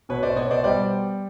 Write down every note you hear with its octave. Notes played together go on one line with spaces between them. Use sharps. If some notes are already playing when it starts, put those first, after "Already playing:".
B2 B4 C#5
C5 D5
B3 C#5 D#5
C5 D5
G3 C5 D5